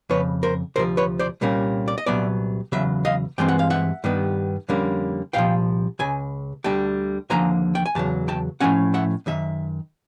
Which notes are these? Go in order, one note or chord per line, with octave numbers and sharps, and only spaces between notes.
F2 C#3 B4 C#5
A#4 C5
D2 C3 F3 A#4 C5
B4 C#5
C5 D5
C2 A#2 G3 A#3 C#4
D5
D#5
C2 A#2 F#3 B3 D5 E5
E2 C#3 F#3 E5
D#5 F5
G2 E3 G#3 C4 G5
F#5
F5
E5 F#5
G2 D#3 G3 B3
F2 D3 G3 A#3 C#4
C2 A#2 F3 F5 G5
C#2 C#3 G#5
D2 D3 G3 G5 A5
D#2 D3 F3 A#3 G#5 A#5
G5
G#5
E2 C#3 F#3 A5
G5 A5
A2 F3 A3 C#4 F#5 G#5
E5 F#5
F#2 D#3 E5